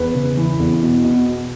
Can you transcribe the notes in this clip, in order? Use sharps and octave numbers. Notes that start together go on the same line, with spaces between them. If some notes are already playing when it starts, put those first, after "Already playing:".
Already playing: E2 B4
C#3
E3
E2
B2
B2